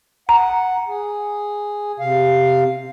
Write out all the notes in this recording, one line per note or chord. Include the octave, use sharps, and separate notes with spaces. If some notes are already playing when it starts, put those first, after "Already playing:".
F#5 A#5
G#4
C3 F5